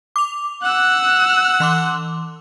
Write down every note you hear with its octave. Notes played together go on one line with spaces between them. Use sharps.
D6 F7
F#5 E6 F#6
E3 C6 D6